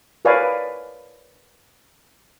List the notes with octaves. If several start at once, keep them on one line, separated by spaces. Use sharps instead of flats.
A#4 B4 C#5 D5 F5 G#5